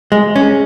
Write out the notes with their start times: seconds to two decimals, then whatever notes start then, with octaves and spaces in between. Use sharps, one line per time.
0.12 G#3
0.36 C#4